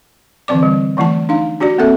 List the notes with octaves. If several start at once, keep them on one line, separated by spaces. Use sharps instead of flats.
D3 E3 F3 C4 D5 D6
G3
E3 F3 A3 E4 A5
D4 D#4 F5
D4 F#4 G4 D5
A#3 C4 A4 E5